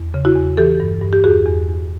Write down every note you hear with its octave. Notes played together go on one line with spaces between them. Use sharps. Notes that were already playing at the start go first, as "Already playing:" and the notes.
Already playing: E2
C#3
E4 F#4
E2
E3 G4 A4
G2
G2
G4
E2 F#4 G#4
E2
E2